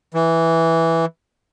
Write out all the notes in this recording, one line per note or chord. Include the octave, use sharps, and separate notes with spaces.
E3